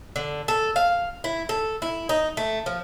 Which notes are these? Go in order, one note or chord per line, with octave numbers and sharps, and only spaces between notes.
D3
A4
F5
E4
A4
E4
D#4
A3
F3